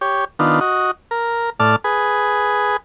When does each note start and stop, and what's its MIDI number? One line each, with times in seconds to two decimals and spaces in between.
0.01 0.25 67
0.01 0.25 73
0.39 0.60 51
0.39 0.60 59
0.39 0.60 62
0.39 0.60 65
0.61 0.91 66
0.61 0.91 75
1.11 1.50 70
1.60 1.76 45
1.60 1.76 74
1.60 1.76 81
1.60 1.76 89
1.84 2.77 68
1.84 2.77 71